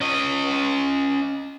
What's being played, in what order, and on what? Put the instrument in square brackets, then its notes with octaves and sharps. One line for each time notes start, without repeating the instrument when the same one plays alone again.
[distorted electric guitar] C#4 D#5